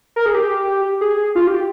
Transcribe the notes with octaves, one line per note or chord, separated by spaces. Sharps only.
A#4
G#4
G4
G#4
F4
G4